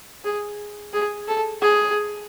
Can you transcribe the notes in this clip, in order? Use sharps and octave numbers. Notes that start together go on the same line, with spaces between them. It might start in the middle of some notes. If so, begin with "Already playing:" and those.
G#4
G#4
A4
G#4